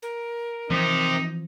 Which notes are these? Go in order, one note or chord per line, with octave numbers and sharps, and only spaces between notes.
A#4
C3 E3 F3 C4 D#4